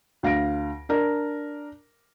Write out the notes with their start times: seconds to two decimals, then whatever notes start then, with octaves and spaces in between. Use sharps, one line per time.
0.23 D2 F5 A#6 D7
0.89 D4 A#4 D5